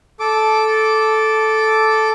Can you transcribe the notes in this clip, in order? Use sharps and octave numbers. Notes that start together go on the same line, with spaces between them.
A4 D6